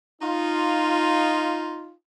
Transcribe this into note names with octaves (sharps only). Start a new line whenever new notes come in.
D#4 F4